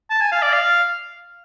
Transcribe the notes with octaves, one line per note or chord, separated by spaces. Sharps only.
A5
G#5
F5
D5
F5